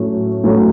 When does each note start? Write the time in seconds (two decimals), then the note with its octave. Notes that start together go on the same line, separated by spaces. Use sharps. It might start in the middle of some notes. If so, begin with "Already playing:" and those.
Already playing: A2 F#3 A3 C#4
0.44 A2 F#3 A3 C#4